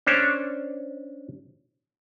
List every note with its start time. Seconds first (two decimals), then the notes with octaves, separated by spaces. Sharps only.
0.07 C#4 D4 C5 C#5